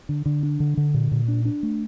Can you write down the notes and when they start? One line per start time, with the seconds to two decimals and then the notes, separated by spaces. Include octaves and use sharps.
0.09 D3
0.26 D3
0.43 D4
0.60 D3
0.77 D3
0.94 A#2
1.12 A#2
1.28 D4
1.45 D4
1.63 A3